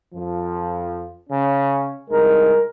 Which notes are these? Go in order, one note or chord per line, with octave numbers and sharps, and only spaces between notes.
F2 F3
C#3 C#4
C2 G#3 D#4 A#4